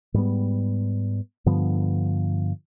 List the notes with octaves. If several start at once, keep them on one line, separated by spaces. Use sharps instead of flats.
G#2 G3 B3
G2 D3 F3 B3